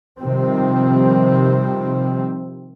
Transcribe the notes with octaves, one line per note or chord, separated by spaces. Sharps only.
C3 D#3 F3 G3 C4